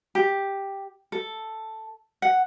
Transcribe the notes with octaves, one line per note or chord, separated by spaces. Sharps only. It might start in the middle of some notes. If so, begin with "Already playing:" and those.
G4
A4
F#5